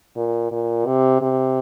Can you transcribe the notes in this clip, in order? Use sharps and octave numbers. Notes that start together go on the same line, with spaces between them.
A#2
A#2
C3
C3